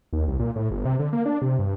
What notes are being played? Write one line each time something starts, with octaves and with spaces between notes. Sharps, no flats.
D#2
C2
A#2
A2
G1
C3
D3
A#3
D4
C3
G2